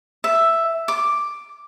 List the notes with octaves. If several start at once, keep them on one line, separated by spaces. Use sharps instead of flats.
E5
D6